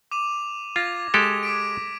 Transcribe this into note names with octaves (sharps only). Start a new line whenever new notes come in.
D6 D#7 F7
F4 G#6 A#6
G#3 G4 A4 E7
D6 B6 D7